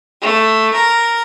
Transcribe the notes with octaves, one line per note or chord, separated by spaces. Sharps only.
A3
A#4